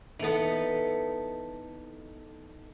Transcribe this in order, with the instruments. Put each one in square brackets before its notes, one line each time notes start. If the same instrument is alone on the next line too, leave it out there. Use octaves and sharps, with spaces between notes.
[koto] E3 B3 [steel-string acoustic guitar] D#4 A4